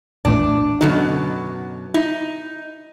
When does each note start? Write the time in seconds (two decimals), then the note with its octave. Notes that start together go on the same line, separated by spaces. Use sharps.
0.25 A#1 E2 A2 D4
0.81 F#2 B2 D3 F#3 D#4
1.94 D#4 E4